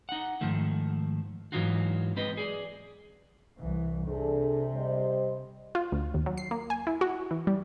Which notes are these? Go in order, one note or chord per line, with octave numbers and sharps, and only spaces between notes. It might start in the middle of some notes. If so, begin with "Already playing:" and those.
D#4 F#5
G#2 D#3 F3 A3
G#2 E3 F#3 D#4 F4 F#4
G#3 C4 B4 D#5
G#4 D5
C2 E3
C3 D4 G#4 A4
G3 C5 D#5
F4
D2
D#2
F#3
C7
A#3
G#5
E4
F#4
E3
G3